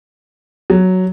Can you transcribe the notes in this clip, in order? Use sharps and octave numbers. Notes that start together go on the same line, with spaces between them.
F#3